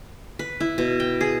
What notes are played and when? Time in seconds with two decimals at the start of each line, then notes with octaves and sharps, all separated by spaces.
0.39 B4
0.60 E4
0.78 B2
1.00 G5
1.21 G#4